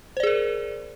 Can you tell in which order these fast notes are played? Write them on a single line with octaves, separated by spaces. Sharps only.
C5 D5 G#4 A#4